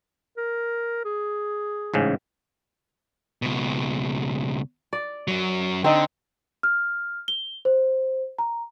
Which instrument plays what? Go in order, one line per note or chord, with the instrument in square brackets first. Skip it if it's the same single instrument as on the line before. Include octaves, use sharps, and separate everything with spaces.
[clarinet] A#4
G#4
[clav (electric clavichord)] A1 G#2 C#3
[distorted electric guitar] C#2 B2
[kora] D5
[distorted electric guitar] F#2 F#3
[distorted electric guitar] D3 [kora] C4 D#4
[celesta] F6
G7
C5
A#5